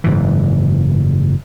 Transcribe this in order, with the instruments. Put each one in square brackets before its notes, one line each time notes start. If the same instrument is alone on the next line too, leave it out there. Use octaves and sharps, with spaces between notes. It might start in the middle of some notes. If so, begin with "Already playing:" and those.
[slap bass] F#1 G#2 E3